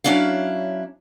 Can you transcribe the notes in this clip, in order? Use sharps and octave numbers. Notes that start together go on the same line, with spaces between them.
F#3 C#4 D4 E4 F5